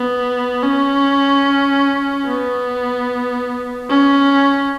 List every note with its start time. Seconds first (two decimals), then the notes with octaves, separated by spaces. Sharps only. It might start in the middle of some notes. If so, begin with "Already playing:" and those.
Already playing: B3
0.63 C#4
2.26 B3
3.89 C#4